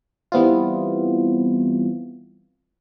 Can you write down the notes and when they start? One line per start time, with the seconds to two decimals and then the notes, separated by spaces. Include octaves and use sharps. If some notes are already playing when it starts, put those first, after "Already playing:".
0.32 E3 G3 B3 C4 E4 F4